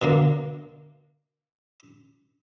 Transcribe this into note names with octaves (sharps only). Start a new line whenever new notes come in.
B2 D3 A#3